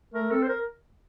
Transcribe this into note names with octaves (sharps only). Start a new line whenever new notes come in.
A3 A#4
C4 A4
C5
A#4